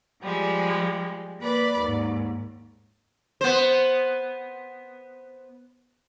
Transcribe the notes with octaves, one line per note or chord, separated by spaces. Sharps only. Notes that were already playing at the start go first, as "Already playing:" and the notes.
F3 G3 G#3
A#3 B4 D5 B5
D#2 G#2
B3 C5